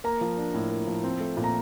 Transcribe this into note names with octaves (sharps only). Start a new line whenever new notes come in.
A#3 A#5
F3
D4
A2
A#3
F3
C4
A3
A#2
A#5